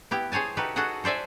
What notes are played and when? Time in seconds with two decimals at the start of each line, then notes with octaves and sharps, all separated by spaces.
0.11 B3 E4 G4
0.32 G#4 C5 C#5 G#5 A5
0.57 D#4 F#4 G4 A4 B4
0.76 F#4 G#4 A4 D#5 F#5
1.04 A4 C5 D5 E5 G#5